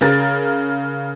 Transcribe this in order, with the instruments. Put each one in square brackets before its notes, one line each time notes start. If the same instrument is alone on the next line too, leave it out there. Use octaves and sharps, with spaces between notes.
[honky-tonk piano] C#3 A#4 A6